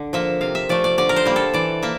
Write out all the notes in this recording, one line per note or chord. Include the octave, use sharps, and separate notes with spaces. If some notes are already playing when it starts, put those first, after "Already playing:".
Already playing: D3
F3 A#3 E5
C3 F5
E5
F3 A3 D5
D5
D3 D5
A#4
C5
G3 A#3
A4
E3 D5
A#3 E5